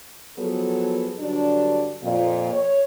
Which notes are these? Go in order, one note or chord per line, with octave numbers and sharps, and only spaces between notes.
F3 F#3 B3 G#4 A4
G2 D3 F#3 D4
F2 A#2
C#5